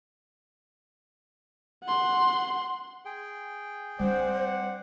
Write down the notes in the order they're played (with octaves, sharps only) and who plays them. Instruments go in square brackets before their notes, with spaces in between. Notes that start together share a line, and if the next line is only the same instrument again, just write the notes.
[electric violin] F#5 C6
[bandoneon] G#4 G5
[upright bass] G3 D4 [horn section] C4 D5 F#5 [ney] C5